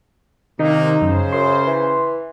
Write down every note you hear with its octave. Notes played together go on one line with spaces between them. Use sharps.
C3 D#3 A#3 D#4
F#2 C#3 C5
F#2 C6
E3